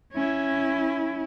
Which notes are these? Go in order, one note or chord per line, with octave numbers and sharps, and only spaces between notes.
C#4 E4